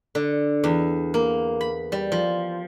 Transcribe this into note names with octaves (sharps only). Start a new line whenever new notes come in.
D3
E2
A#3
B5
G3
F3